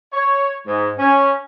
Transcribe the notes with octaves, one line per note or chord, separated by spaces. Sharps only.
C#5
G#2
C#4